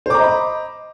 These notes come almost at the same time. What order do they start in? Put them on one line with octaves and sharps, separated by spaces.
C5 D6 A#5 D#5 B5